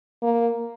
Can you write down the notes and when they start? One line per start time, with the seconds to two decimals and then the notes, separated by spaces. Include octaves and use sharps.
0.23 A#3